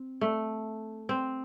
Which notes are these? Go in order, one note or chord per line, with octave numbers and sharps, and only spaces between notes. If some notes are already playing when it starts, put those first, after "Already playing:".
Already playing: C4
A3
C4